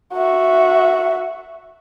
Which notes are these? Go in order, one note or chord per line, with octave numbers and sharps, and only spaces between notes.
F#4 E5